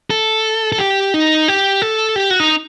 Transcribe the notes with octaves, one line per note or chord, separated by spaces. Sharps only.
A4
A4
G4
D#4
G4
A4
G4
F#4
D#4